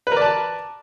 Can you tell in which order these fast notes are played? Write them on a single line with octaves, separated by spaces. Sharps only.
B4 A#4 D5 A5